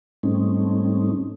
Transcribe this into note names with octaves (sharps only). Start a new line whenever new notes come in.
G#2 G3 A3 C4 C#4 D#4